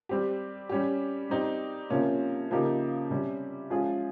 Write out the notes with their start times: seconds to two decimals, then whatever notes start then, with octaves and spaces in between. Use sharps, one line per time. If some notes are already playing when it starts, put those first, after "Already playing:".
0.09 G3 C4 G4
0.69 G3 C#4 G4
1.30 G3 C4 D#4 G4
1.90 C3 F3 A#3 C#4
2.50 C#3 F3 A#3 D#4 G4
3.10 C3 G3 C#4 G4
3.70 F3 G#3 C#4 F4 G#4